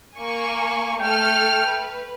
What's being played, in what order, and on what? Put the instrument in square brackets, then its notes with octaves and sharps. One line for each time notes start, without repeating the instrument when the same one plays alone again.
[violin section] A#3 G#5 C#6
[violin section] A3 A4 F6 [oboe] G5
[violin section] B4